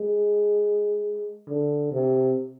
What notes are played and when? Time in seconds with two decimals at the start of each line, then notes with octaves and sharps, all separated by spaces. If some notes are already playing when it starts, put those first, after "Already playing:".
Already playing: G#3
1.48 D3
1.92 C3